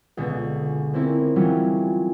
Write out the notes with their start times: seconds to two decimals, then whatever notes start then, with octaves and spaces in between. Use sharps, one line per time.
0.17 C#2 B2 D3
0.94 A#3 C4 C#4 E4
1.36 E3 F#3 G3 C#4 F4